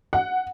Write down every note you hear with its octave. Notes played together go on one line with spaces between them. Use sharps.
F#5